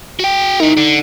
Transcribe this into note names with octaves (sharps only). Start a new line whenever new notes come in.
F#4 G5
D#4 E4 A#4
D3